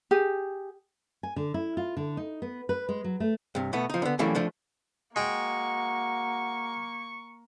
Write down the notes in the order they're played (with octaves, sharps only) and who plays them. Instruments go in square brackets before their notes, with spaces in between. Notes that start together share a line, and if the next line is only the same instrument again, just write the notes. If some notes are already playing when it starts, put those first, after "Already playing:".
[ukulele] G4 G#4
[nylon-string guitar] G#5
D3
E4
F4
D3
D#4
B3
B4
G#3
F#3
A3
[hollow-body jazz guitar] G2 C3
B2 A3 B3
F3 D#4
D3 B3
E3 F#3 G3 A3 A#3 C#4
F3 A3 D4
[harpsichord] G#3 G5 [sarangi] A#3 [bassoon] F#4 [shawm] C#6